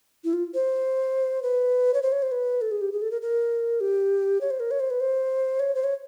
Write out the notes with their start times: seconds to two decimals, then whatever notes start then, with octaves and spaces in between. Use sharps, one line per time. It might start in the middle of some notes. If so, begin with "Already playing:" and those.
0.24 E4
0.33 F4
0.54 C5
1.43 B4
1.94 C#5
2.02 C5
2.12 C#5
2.22 C5
2.32 B4
2.61 A4
2.71 G#4
2.81 G4
2.92 G#4
3.02 A4
3.11 A#4
3.22 A#4
3.81 G4
4.41 C#5
4.50 C5
4.60 A#4
4.71 C#5
4.80 C5
4.90 B4
5.00 C5
5.60 C#5
5.75 C5
5.84 C#5